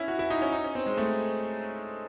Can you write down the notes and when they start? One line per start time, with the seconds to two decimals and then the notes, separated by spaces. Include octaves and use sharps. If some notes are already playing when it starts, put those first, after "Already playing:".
Already playing: C#4 E4
0.08 F#4
0.19 E4
0.30 D#4
0.42 C#4
0.52 D#4
0.64 C#4
0.75 C4
0.86 G#3
0.97 A3